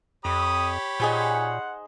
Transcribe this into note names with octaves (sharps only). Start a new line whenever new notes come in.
F2 G4 C#5 B5 D#6
A#2 D#4 G#4 C5 F#5